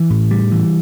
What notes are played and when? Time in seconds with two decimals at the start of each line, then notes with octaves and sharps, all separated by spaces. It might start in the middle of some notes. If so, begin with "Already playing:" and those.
Already playing: E3
0.10 A2
0.31 G3
0.52 E3